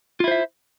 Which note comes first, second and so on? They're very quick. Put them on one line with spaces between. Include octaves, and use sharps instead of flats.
F4 E4 C5 E5